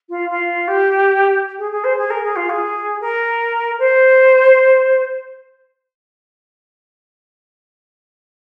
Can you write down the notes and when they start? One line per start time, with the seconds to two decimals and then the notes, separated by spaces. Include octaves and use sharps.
0.09 F4
0.29 F4
0.68 G4
1.59 G#4
1.71 G#4
1.84 C5
1.98 G#4
2.10 A#4
2.23 G#4
2.36 F4
2.50 G#4
3.01 A#4
3.79 C5